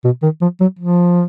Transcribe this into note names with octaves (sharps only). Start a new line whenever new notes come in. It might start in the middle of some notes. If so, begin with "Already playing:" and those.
B2
D#3
F3
F#3
F3